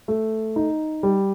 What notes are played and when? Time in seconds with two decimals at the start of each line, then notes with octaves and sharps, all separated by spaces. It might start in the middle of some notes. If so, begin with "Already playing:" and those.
0.08 A3
0.56 D#4
1.03 G3